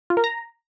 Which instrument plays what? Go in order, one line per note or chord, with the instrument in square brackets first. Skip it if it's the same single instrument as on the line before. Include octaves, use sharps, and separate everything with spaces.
[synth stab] F4
A#4
A#5